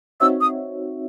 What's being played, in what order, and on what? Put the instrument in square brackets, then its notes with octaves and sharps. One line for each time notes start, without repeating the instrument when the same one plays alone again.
[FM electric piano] C4 D#4 F#4 C#5 E5 [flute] E6
[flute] D#6